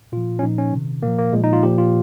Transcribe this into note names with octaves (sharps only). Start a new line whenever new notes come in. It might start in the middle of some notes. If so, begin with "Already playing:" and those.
A#2 F3 F4
C#4
A#2 F3 D#4
C#4
C3 D#3
A#2 F3 A#3
A#3
A#2 F3 G#3
D#4
F4
A#2 F3 G4
F4